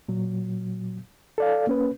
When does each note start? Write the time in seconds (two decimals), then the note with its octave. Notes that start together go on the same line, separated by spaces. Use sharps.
0.09 A#2 F#3
1.38 A4 D5 F5
1.67 A#3 C#4 B4